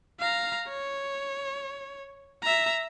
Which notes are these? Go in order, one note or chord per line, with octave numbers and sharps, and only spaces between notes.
F5 A#5
C#5
E5 A#5